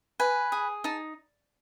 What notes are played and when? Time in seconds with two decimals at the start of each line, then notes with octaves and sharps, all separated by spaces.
0.20 B4 G#5
0.52 G#4
0.84 D#4 A5